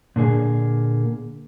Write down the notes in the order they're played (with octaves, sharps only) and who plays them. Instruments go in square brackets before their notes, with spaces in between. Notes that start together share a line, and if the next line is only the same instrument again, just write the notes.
[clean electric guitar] A#2 D3 A#3 G#4